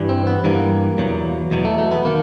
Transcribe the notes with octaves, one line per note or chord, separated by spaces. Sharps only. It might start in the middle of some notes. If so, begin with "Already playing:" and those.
Already playing: G2 E3 G3
C4
B3
G2 E3 G3 A#3
E2 B2 F#3
E2 B2 F#3
A3
A3
B3
D#3 A#3